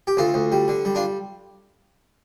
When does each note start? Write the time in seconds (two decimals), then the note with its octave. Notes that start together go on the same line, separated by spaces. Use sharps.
0.07 G4
0.17 D2 F4 A4
0.34 D2
0.52 G3
0.68 D3
0.85 G3
0.95 D4 F4